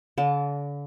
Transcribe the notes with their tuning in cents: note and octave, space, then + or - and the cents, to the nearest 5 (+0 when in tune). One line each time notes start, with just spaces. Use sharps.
D3 -40 A5 +0